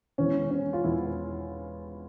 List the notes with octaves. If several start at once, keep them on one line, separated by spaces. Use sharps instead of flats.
E1 E2 E3 C#4
C#4
F4
E1 E2 E3 E4